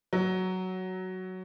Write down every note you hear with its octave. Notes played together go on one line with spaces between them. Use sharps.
F#3